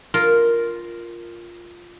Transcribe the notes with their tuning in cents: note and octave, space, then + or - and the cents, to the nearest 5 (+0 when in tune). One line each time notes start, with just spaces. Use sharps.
F4 +0 A#4 +0